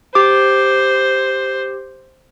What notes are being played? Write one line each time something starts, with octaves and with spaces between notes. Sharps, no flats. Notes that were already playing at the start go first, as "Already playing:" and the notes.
G4 C5 D6